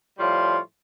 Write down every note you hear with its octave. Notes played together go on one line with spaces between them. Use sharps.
A2 F3 G3 F4 C#5 C6